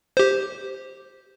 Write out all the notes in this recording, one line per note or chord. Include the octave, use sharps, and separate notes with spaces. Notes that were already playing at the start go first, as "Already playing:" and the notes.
G4 C5